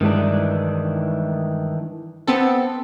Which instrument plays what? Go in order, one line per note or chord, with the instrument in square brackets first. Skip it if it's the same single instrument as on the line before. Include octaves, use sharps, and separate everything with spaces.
[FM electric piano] G2 G3 G#3 [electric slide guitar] D#3 E3 D4
[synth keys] B3 C4 A4